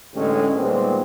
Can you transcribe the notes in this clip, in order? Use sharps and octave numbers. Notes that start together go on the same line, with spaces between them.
A1 D3 G#3 A3 C#4 G4
A#2 D#3 G3 G#3 B3 C4